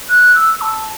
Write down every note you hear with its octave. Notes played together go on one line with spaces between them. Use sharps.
F#6
E6
A5